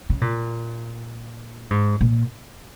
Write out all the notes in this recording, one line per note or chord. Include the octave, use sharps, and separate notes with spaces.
C#3
A#2
G#2
A#2